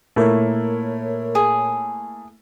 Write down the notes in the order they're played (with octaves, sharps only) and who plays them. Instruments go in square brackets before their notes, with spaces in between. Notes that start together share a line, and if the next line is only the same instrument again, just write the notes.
[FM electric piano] A#2 A#4 C#5 [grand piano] A3 A#3 E4
[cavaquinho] G#4